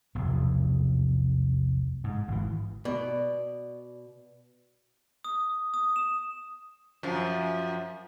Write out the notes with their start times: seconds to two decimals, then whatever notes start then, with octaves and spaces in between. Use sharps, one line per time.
0.15 F1 B1 E2
2.04 G#2
2.28 G#1 E3
2.85 B2 D5
5.24 D#6
5.74 D#6
5.96 E7
7.03 F#2 F3